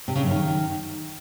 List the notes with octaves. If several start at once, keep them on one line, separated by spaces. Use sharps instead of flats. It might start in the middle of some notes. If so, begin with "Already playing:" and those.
C3
C#3
F#2
D#3